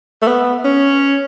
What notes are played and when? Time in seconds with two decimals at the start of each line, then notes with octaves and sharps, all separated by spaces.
0.22 A3
0.28 B3
0.65 C#4